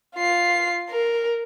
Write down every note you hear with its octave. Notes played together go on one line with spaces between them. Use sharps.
F4 C7
A#4